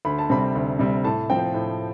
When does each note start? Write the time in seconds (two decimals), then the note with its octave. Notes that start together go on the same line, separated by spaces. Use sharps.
0.05 D2 B5
0.18 A5
0.30 C3 G3 C4 B5
0.55 D2
0.79 C3 G3 C4
1.04 A2 A5
1.30 F3 C4 G5
1.54 A2